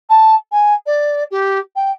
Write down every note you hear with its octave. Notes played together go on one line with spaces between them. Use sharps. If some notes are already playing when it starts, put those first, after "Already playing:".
A5
G#5
D5
G4
G5